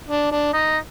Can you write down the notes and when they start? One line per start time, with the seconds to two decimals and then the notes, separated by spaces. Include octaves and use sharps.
0.08 D4
0.31 D4
0.53 D#4